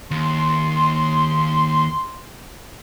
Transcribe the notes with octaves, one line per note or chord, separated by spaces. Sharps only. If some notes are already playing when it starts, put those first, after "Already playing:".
D#2 C6